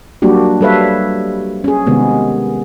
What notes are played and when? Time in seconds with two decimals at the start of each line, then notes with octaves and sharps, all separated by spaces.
0.22 F#3 G3 A#3 D4 F#4 G4
0.61 G3 A4 B4 C#5 E5 F5
1.64 C#4 G#4
1.87 C3 D#3 G#3 B3